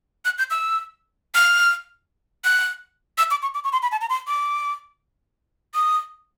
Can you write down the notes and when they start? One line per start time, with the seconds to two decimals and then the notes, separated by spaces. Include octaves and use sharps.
0.25 F#6
0.38 G6
0.51 E6
1.35 F6
2.44 F#6
3.18 E6
3.31 D6
3.42 C#6
3.54 D6
3.64 C#6
3.72 C6
3.82 B5
3.91 A5
4.01 A#5
4.09 C6
4.27 D6
5.74 D#6